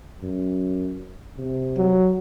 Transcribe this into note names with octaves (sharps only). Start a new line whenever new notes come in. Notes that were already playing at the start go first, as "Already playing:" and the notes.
F#2
C3
F#3